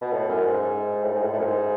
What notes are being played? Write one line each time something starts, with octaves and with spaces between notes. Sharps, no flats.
B2
A2
F#2
G#2
A2
G#2
A2
A2
F#2
G#2